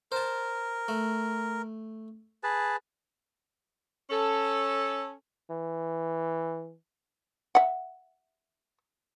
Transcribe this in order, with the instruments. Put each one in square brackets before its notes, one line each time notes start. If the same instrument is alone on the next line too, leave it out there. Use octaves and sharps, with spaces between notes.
[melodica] A#4 [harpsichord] C5 A5
[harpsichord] A3
[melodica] G#4 B4 A5
[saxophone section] C#4 A4
[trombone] E3
[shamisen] E5 F#5